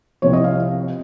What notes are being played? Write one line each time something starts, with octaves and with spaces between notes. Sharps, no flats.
C2 C3 F3 C#5
D#5
F5